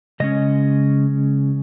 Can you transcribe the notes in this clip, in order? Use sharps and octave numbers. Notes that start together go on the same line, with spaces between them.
C#3 G#3 C#4 D#5